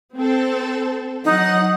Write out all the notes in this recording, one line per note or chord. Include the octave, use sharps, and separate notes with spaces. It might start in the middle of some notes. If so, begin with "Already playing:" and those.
C4 A4
F#3 D#4 F#5